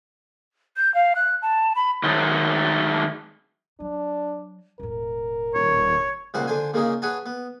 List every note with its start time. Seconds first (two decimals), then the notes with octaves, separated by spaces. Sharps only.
0.77 G6
0.94 F5
1.15 F#6
1.42 A5
1.75 B5
2.04 D#3 F#3 G#3 A3 D#4
3.80 F#3 D4
4.80 E1 A2 A#4
5.55 D#1 C#5
6.34 C#2 A#2 G3 C5 F#5
6.47 D3 C5 G#5
6.74 A#2 C#3 A#3 D#4 G#4
7.02 G#4 B4 C#5 F#5 G#5 A5
7.26 B3